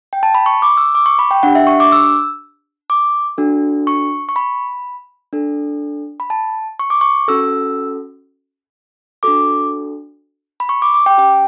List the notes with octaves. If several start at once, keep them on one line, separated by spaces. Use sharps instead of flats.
G5
A5
B5
C#6
D6
E6
D6
C#6
B5
G5
D4 G4 F#5
E5
C#6
D6
E6
D6
D4 F#4 A4
C#6
C#6
B5
D4 A4
B5
A5
C#6
D6
C#6
C#4 F#4 A4 E6
D4 F#4 A4 D6
B5
C#6
D6
D6
G5
C#4 G4 G5